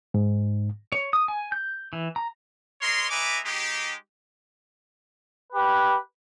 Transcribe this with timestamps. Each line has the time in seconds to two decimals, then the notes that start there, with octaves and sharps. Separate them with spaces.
0.14 G#2
0.92 C#5
1.13 D#6
1.28 G#5
1.52 G6
1.93 E3
2.16 A#5
2.81 A#4 C#5 D#5 C6
3.10 D#4 B4 E5 G#5 A#5 D6
3.44 G#3 D#4 G4
5.53 G4 B4